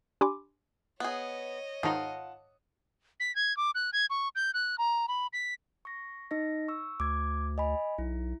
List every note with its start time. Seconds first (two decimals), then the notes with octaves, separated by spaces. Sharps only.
0.21 D4 G4 G#5 B5 C6 D6
1.00 B3 G#4 C#5 D#5
1.83 G#2 D#3 D#4 F4 F#5 A5 D#6
3.20 B6
3.35 G#6
3.57 D6
3.75 F#6
3.93 G#6
4.10 C#6
4.35 G6
4.54 F#6
4.78 A#5
5.08 B5
5.33 B6
5.85 C#6 A#6
6.31 D#4 D#5 A#6
6.68 C#6 E6
7.00 D2 D6 G#6
7.58 D#5 G#5 B5
7.98 B1 E4